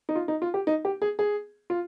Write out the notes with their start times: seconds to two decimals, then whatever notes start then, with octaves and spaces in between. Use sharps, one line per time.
0.09 D#4
0.15 F4
0.28 D#4
0.42 F4
0.54 G4
0.67 D#4
0.85 G4
1.02 G#4
1.19 G#4
1.70 F4